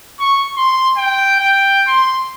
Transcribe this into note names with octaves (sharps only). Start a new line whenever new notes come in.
C#6
C6
G5
G5
C6